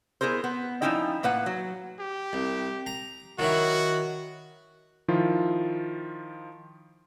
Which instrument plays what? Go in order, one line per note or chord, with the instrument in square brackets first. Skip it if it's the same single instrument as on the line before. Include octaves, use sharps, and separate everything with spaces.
[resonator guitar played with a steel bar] B3 E4 G#4 A#4 C5
B3
F3 A#3 C#4 D#4 E4 G5
A2 A#3 B4 F#5
F#3
[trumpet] G4
[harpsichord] C2
A#5
[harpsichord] D#3 F#3 E4 [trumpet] F#4
[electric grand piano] D#3 F3 E4 F4